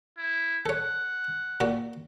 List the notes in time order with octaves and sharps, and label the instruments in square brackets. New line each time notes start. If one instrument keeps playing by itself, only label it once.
[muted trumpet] E4
[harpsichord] A4 C#5 [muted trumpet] F#5
[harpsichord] A#2 F#4